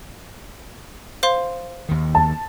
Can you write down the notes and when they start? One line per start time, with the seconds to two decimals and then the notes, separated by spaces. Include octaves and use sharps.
1.23 C5 F5 C6
1.89 D#2 D#3
2.15 A5